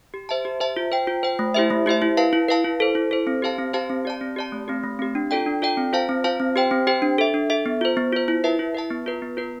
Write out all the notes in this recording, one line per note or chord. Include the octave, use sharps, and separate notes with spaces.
G4
C5 E5 A5
G4
C5 E5 A5
F4
C5 G5
F4
C5 G5
A3
E4 G4 C5 E5
A3
E4 G4 C5 E5
E4
B4 F5 A5
E4
B4 F5 A5
E4
A4 C5
E4
A4 C5
C4
G4 C5 F5 A5
C4
G4 C5 F5 A5
C4
G4 D5 A5
C4
G4 D5 A5
A3
C4 G4
A3
C4 G4
D4
F4 A4 D5 G5
D4
F4 A4 D5 G5
C4
F4 C5 F5 A5
C4
F4 C5 F5 A5
C4
G4 C5 G5
C4
G4 C5 G5
D4
A4 E5
D4
A4 E5
B3
F4 C5
B3
F4 C5
E4
B4 E5 A5
E4
B4 E5 A5
B3
F4 B4
B3
F4 B4